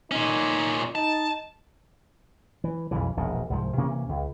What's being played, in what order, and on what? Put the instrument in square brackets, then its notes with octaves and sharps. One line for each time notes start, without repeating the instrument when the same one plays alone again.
[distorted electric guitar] A#2 C#4 [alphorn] D#4
[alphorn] D#4 [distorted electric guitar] A5
[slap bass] E3
B1 F2 C#3 E3
E1 A#1 B2
C2 G#2 F3
C3 E3 A#3 C#4
C#2